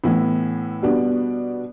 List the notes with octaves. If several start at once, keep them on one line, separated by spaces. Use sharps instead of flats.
A2 E3 B3 E4
B2 G3 B3 D4